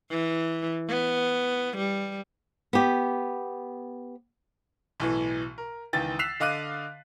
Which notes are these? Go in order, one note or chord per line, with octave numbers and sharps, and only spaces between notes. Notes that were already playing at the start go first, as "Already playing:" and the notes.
E3
B3
G3
B3 G4
B1 A2 E3
A#4
C#2 D#3 E3 G5 A6
E6 F#6 B6 C7 E7 F7
D3 D#5 F5 D6 F#6 D#7